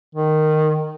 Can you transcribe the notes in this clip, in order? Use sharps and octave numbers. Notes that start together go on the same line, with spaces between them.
D#3